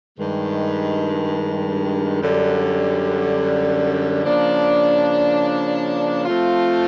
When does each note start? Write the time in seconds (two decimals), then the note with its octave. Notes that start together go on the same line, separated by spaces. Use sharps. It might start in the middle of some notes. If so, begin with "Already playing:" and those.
0.19 G2 D#3 G#3
2.21 F#2 D3 G3
4.23 C#3 F3 A#3 D4
6.25 F3 A3 C4 F4